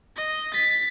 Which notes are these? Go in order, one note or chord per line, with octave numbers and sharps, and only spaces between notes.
D#5
A6 B6